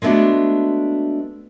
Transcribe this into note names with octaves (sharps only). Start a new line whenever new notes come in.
G#3 A3 B3 C#4 D4 F#4